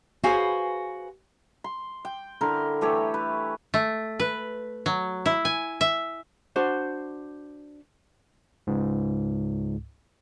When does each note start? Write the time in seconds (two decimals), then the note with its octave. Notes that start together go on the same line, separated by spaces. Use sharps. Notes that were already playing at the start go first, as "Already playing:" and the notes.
0.24 F#4 G#4 B4 C5 F5 G#5
1.64 C6
2.05 G5
2.41 D3 E4 A#4 C6
2.81 E3 A3 G4 C#5
3.14 B4
3.74 A3
4.20 B4
4.86 F#3
5.26 E4
5.45 G#5
5.81 E5
6.56 D4 F#4 C5
8.67 C#2 G#2